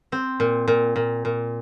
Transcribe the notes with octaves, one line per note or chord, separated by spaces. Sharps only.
C4
A#2
A#2
A#2
A#2